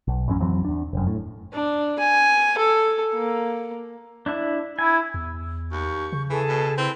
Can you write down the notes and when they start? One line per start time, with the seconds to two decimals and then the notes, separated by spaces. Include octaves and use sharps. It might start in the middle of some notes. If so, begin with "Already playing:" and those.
0.08 B1
0.28 A1 F#2 C#4
0.40 F2 E3 F#3 C4
0.65 E2 D4
0.93 F1 F#2
1.07 A2
1.53 D4
1.99 G#5
2.58 A4
3.14 A#3
4.26 D4 E4 E5
4.79 E4 G#5
5.14 E2
5.72 D#2 C#6 G6
6.12 C#3
6.30 E3 G#4 A4
6.49 B2
6.78 C4 E4 B4